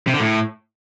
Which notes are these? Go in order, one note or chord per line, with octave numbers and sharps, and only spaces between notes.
C3
D3
A2